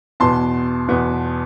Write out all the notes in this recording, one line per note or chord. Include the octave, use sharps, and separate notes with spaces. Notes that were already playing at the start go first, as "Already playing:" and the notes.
E2 B2 B3 A5 C6
E2 B2 B3